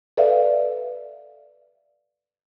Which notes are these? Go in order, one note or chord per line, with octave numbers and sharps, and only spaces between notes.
A4 B4 D5 E5 F5